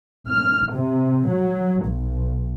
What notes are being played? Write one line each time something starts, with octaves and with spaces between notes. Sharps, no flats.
F6
C3
F#3
B1